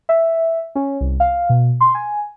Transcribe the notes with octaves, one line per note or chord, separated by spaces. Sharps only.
E5
C#4
C2
F5
B2
C6
G#5